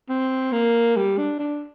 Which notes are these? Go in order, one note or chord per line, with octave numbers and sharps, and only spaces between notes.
C4
A#3
G3
D4
D4